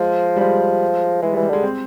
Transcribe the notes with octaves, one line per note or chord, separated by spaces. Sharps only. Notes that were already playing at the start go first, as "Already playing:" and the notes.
Already playing: F3 G#3
G3
F3 G#3
E3 G#3
G3
E3
G3
D3 G#3
C4